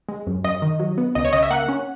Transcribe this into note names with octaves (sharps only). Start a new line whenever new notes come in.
G#3
F#2
F#2 D#5
D#3
F#3
B3
C#2 D#5
C#5
C#3 D#5
E5
A#3 F#5
C#4